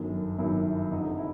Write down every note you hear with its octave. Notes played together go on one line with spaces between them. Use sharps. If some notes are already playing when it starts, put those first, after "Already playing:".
Already playing: G1 F#2 D#3
G1 F#2 D#3 E4
F1 F2 D3 D#4
E4